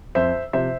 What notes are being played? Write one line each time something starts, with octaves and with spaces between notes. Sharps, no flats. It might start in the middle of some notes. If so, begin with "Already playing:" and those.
F2 C5 E5
C3 F3 C5 E5